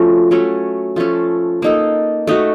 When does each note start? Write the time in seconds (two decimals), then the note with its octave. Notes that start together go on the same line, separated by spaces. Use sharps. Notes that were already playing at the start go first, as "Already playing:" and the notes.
Already playing: F3 A3 C#4 F#4
0.31 F#3 A3 C#4 A4
0.96 F3 A3 C#4 A4
1.62 A#3 D#4 A4
2.27 A3 D#4 F#4